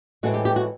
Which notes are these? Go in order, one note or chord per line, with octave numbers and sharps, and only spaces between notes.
A2 E3 G#3 C4 F#4
G4
G4
F#4